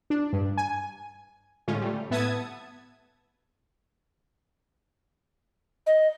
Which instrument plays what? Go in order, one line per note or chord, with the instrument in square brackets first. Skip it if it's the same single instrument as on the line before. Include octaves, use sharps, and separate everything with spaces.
[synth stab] D4
G2
G#5
A2 D3 G#3 A3 C#4 F4
G3 A3
A2 B3 E5 A5 D#6 G#6
[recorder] D#5